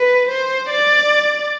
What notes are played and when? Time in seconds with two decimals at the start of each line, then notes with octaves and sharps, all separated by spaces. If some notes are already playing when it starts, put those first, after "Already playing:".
Already playing: B4
0.29 C5
0.70 D5